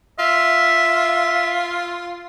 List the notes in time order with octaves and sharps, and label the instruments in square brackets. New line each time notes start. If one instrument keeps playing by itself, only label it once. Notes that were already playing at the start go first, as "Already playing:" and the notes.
[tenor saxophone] F4 [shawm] E5